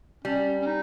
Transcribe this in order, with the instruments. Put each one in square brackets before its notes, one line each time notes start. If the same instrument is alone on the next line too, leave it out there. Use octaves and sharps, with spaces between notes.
[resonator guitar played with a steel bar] G3 [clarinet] C#4
[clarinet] C#4
D#4